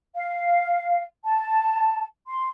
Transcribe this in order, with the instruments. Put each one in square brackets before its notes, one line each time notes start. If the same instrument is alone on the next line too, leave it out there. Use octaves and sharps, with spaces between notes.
[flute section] F5
A5
C6